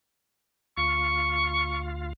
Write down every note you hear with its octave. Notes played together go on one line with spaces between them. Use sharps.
D2 F4 F5 C#6